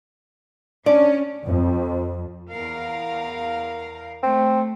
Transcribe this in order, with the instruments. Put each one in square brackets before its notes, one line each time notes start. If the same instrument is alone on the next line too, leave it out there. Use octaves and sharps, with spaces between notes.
[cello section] C#4 [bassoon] D4 [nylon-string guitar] D5
[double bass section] F2
[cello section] E2 A#4 F5
[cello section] A3 [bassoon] C4